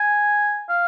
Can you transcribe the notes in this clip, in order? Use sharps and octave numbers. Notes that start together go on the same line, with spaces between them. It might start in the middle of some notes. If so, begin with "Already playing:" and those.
Already playing: G#5
F5